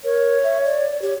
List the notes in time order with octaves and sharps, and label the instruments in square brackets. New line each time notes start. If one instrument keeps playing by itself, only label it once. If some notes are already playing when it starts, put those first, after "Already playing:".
[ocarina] A#4 [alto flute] C#5
[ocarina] E5
D5
[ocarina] G4 [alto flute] C#5